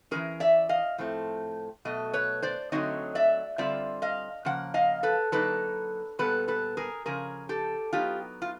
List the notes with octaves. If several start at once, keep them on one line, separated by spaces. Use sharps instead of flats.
E3 G#3 C#4 G#4 A#4
D5 E5
D#5 F5
A2 F3 A3 C4
B2 F#3 A3 D#5
B4 C#5
C5 D5
D3 F#3 A3 C4 D#4 C#5 D#5
D5 E5
D3 G3 C4 F4 D5 E5
D#5 F5
C#3 F3 A#3 F#5
D#5 F5
A4 B4
D3 F#3 A#3 D#4 A4 B4
A#2 G3 B3 A4 B4
A4 B4
G#4 A#4
C#3 F3 G#4 A#4
G4 A4
F#3 B3 D#4 F4 G4
F4